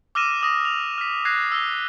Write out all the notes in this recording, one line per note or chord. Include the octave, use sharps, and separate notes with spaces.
D6 E6 F6 A#6 D#7 E7
D6 D#6 A#6
F7
F6 B6
F#6 G#6 A#6 C7
E6 A#6 G7